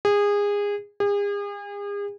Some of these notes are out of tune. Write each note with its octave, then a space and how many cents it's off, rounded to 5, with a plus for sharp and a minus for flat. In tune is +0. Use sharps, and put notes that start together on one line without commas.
G#4 -25
G#4 -40